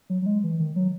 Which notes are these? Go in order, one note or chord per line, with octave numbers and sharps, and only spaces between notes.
F#3
F#3
G#3
E3
D#3
F#3